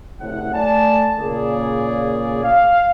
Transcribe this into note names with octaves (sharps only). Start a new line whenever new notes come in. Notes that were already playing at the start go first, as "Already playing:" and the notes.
F#1 A2 C3 F#5
A3 D5 G#5 A5
A#2 C#3 A#3 G#4 D5
F5